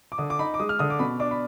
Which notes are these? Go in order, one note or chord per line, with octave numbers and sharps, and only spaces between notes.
D6
D3 D#6
D6
D#4 B5
D6
G#3 D#6
F6
D3 D#6
D6
B2 B5
D4 D6
B5